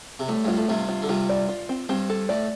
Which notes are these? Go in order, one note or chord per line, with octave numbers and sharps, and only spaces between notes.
C3
A2 G3
G2 F4
A2
G2 C3 F4
F4
D3
G2 C3 F4
D5
F4
C4
G2 C4
A4
A2 D5